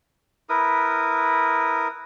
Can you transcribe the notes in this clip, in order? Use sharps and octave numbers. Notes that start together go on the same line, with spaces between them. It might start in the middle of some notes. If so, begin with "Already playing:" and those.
E4 A#4 B4 D#6